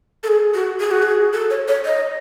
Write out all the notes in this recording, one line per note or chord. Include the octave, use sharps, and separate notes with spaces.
A4
G#4
F#4
G#4
F#4
G#4
A4
C#5
C#5
D#5